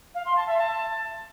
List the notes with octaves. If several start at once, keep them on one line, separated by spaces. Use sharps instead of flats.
F5
C6
A5
E5
A5